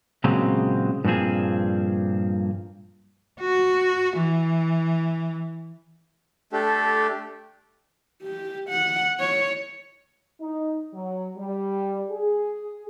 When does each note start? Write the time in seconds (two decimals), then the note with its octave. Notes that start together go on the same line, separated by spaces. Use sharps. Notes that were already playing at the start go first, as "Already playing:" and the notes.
0.24 A#2 C#3 F#3 G#3 C4
1.04 G2 A#2 F3 C4 G#4
3.40 F#4
4.16 E3
6.53 A3 D4 G4 A4
8.23 G4
8.69 F#5
9.20 C#5
10.41 D#4
10.94 F#3
11.37 G3
12.11 G#4